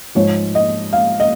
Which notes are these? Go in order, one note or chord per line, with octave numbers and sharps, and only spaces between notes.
G#2 F3 G#3 C#5
D#5
F5
D#5